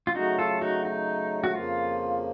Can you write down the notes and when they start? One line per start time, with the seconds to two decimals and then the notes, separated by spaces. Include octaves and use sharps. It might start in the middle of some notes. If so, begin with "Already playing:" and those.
0.07 F4
0.15 C#3 F#3 A3 D#4 F#4
0.39 F4 A4
0.61 D#4 F#4
0.85 D#4
1.44 F#4
1.54 F2 C#3 F3 A#3 F4